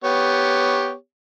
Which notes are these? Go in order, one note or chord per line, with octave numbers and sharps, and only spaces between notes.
B3 G4 C#5